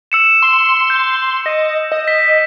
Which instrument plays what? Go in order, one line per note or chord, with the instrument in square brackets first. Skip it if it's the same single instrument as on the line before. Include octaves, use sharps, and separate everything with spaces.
[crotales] E6 C#7 E7
[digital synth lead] C6
[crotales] G6
[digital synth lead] D#5
D#5
[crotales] B6